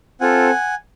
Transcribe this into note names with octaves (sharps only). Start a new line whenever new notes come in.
C4 F4 A4 F#5 G#5